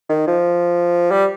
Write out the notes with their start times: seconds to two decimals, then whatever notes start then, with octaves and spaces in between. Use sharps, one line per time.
0.10 D#3
0.27 F3
1.11 G3